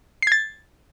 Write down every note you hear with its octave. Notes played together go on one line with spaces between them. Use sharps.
G#6 A6 C7